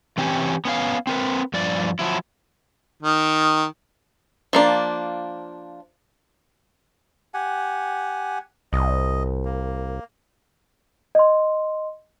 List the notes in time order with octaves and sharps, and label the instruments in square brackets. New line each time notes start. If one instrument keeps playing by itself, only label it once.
[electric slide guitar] E3 C4 C#4 G4
B3 C#4 A#4 F5
C4 A#4 B4
G2 F3 D5
F3 F#3 E4
[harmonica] D#3
[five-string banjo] F3 A#3 D4
[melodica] G4 F#5 G#5
[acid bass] C2 [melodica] D#5
[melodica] A#3
[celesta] D#5 C6